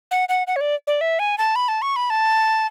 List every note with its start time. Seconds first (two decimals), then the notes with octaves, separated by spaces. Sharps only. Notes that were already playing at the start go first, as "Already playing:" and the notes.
0.11 F#5
0.29 F#5
0.47 F#5
0.56 C#5
0.61 D5
0.87 D5
1.01 E5
1.19 G#5
1.38 A5
1.56 B5
1.68 A5
1.82 C#6
1.96 B5
2.10 A5